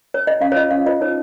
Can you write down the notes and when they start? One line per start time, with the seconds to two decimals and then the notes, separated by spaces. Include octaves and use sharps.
0.14 C#5
0.27 D#5
0.41 C#4 F5
0.52 C#5
0.56 F4 C5 D#5
0.71 C#4 F5
0.86 F4 C5 D#5
1.01 D#4 C#5